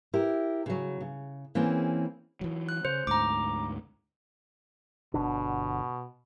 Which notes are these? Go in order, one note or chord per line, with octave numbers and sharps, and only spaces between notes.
E4 G4 A#4
C#3 F#3
C#3
E3 A#3 C4 C#4 G#4
E3 F#3
F#6
C#3 C5
D2 G#2 A#5 D6
G1 B2 D3 D4